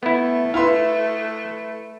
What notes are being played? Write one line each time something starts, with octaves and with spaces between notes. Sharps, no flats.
A3 B3 E4
E4 B4 F5 C6